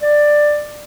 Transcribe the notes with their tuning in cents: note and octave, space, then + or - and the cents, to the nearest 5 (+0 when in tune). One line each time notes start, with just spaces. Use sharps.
D5 +10